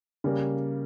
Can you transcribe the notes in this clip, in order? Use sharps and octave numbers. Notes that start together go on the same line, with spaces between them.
C#3 G3 A#3